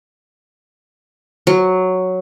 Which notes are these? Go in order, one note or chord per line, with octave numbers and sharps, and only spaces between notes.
F#3